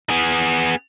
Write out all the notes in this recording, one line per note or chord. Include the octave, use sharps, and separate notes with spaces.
B3 G#4